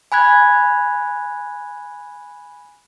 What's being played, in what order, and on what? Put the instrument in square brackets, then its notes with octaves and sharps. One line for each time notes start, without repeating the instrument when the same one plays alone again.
[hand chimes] G#5 B5 F#6 G#6